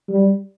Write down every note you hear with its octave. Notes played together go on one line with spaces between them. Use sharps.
G3